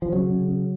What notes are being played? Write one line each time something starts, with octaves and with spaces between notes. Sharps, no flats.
F3
C#3 F#3
C#3
C#3